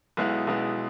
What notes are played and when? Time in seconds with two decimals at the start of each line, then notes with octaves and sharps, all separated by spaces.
0.17 B1 B2 G#3 B3 E4
0.47 B1 B2 G#3 B3 E4